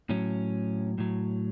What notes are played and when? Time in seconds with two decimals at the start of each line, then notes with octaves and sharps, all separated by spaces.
0.10 A2 F#3 C#4
0.98 A2 F#3